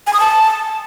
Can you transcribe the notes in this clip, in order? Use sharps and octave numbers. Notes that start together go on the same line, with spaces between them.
G#5
D#6
A5